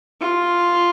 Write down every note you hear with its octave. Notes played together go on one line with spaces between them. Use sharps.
F4